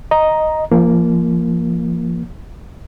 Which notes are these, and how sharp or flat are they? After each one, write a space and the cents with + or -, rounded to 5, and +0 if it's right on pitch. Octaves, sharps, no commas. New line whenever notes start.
D#5 +0 A#5 +5
F3 -30 A#3 +0